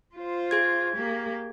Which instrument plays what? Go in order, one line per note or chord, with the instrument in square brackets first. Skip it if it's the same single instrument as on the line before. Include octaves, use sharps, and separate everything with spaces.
[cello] F4 C5
[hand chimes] G#4 G#6
[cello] A#3 G4